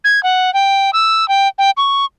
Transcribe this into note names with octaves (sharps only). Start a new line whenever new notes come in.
G#6
F#5
G5
E6
G5
G5
C#6